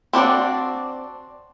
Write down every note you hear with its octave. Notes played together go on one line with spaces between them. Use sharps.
C4 D4 F#4 D5